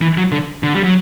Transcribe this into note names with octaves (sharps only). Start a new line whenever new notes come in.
E3
F#3
D3
D3
G3
F#3